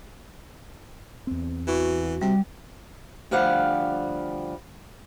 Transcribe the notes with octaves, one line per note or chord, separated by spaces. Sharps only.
E2 C4
E3 F#4
C3 G3
D2 F3 G3 F5 F#5